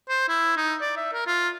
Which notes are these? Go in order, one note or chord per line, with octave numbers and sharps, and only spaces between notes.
C5
E4
D#4
D5
E5
A#4
F4